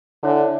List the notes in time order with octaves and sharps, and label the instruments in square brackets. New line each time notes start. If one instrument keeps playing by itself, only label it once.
[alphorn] D3 [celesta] E4 A4 C#5 E5 G#5